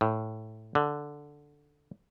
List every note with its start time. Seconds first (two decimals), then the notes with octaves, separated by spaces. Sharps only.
0.01 A2
0.75 D3